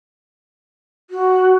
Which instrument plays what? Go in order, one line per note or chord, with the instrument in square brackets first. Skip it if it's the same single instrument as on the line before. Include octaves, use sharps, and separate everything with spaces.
[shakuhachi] F#4